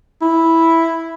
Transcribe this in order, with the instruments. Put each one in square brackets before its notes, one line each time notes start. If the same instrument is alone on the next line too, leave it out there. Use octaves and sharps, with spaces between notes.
[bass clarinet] E4